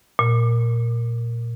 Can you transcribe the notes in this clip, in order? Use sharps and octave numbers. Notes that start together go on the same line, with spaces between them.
A#2